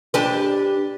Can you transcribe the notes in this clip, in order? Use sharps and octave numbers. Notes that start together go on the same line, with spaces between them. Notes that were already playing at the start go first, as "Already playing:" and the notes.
D4 G4 B4